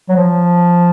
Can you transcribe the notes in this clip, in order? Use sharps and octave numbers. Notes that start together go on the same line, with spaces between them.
F#3
F3